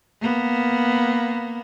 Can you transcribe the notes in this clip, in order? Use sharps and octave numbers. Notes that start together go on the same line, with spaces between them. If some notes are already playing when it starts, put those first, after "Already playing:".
A#3 B3